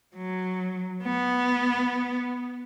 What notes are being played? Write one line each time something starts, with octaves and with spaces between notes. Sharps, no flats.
F#3
B3